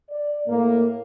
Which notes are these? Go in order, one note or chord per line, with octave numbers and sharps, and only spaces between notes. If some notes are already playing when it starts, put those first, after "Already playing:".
D5
A2 A#3